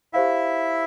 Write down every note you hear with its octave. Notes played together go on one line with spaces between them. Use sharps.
E4 G4 C5 E5 F5